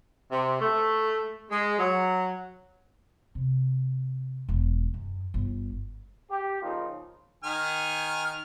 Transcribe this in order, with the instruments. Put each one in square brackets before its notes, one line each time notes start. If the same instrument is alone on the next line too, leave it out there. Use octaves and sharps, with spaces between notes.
[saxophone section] C3
A3
G#3
F#3
[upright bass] C3
E1
F#2
G1
[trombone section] G4
C#3 F3 A#3 D#4 F4
[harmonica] D#3 G#5 F6